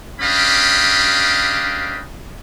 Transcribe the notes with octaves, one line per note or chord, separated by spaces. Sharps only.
C#4 D4 G4 D#5 F5 B5